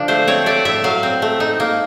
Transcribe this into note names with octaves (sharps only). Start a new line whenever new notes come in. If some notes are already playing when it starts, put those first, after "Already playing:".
Already playing: D3 F3 D4
A3 C5
C4 C#5
A3 D5
A2 E5
F#3 F5
C4
A3
D#4
A#3